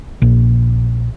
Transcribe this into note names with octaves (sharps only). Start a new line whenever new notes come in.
A#1